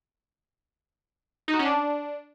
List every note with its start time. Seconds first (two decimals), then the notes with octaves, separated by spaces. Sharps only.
1.48 D#4
1.54 F#4
1.59 C#4
1.65 D4